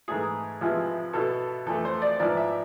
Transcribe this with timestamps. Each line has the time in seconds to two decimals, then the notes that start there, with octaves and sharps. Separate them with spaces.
0.08 G#2 E3 A3 E4 G#4
0.61 C3 F3 G#3 B3 E4
1.13 B2 B3 E4 A4
1.66 F2 E3 A3 A4
1.85 C5
2.02 D5
2.19 G#2 F3 B3 E4 D5
2.37 E5